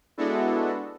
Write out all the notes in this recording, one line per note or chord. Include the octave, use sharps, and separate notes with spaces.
G#3 B3 D4 E4 F#4 A4